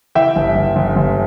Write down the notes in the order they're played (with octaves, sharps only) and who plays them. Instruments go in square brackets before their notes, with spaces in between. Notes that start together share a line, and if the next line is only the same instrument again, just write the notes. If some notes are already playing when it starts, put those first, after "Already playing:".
[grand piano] E3 E5 G5
G1
G1
G1
G1